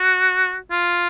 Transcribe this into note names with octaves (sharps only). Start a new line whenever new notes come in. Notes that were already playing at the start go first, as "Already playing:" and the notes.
Already playing: F#4
F4